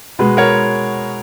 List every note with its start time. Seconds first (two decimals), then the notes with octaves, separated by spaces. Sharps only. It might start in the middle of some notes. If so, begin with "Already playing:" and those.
0.19 B2 G#3 B4
0.37 A#4 C#5